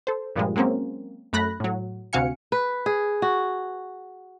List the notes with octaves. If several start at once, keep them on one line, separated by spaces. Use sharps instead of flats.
A4 C5
G2 A#2 F3 G3 G#3
F#3 G#3 A#3 C4 C#4
F#2 A3 B5 F#6 A#6
A2 F#3
D2 C3 F#4 F5 G#5 C#7
B4
G#4
F#4